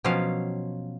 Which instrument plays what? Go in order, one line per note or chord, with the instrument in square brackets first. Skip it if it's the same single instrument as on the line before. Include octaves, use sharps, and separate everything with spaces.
[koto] B2 F3 F#3 C#4 F5